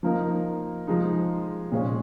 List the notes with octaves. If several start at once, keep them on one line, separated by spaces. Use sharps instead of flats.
F3 A#3 D#4 A#4
F3 G#3 D#4
A#2 G#3 C#4